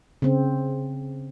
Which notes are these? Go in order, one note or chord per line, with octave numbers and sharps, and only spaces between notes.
C#3 C4